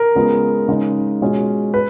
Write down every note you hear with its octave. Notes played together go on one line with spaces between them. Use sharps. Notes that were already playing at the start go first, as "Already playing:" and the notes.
Already playing: A#4
C#3 G#3 B3 F4
C#3 G#3 D#4
B2 G#3 C#4 F4
B4